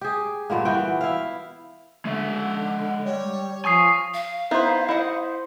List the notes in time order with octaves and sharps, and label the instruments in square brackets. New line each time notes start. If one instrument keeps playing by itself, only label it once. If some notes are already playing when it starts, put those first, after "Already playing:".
[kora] G4 G#4
G2 A#2 D3 A#3
E3 B3 F#4 G5
E4 F5
[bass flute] D3 [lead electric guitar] G#3 E5
[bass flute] G3 [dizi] C#5
[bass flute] F3 [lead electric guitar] G#5 [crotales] C#6 D#6 C7
[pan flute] F5
[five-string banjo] B3 E4 [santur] D#4 C5
[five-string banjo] E4 D#5 F#5